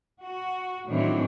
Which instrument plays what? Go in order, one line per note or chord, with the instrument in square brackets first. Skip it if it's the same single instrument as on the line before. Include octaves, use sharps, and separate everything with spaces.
[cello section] F#4
A2 D#3 E3 F#3 C4 D4